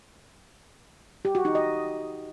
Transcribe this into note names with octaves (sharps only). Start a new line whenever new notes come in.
G4
F#4
D#4
D#5